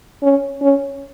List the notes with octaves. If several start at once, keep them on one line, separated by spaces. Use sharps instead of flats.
C#4
C#4